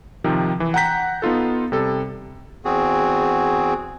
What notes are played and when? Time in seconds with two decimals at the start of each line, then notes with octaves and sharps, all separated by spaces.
0.24 C3 D#3 F3
0.60 E3
0.74 F#5 G5 A#5 G6 B6
1.22 B3 D#4 F4 A4
1.72 C3 G3 A4
2.65 E2 C4 F#4 G#4